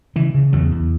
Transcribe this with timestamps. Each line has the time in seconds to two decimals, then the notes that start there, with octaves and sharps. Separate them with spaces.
0.16 C#3 E3
0.34 C#3
0.53 E2 F#3
0.72 E2